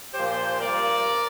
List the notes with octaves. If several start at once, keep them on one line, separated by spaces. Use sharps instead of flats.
A#2 F3 A#3 G4 C5
G2 F3 A#3 A#4 D5